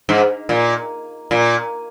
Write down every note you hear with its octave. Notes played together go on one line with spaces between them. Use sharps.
G#2
A#2
A#2